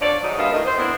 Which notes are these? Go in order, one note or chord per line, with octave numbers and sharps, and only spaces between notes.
D3 F3 C#5 D5
G#2 F#3 D#4
G2 A#2 B3 F4 D#5 E5
D2 A2 D#3 D#4 A#4 D#5
C5
B3 C4 D4 E4